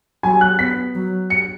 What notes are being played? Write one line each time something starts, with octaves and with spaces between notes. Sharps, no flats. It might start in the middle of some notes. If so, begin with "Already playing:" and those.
F#3 G#5
F#6
B3 B6
F#3
C#7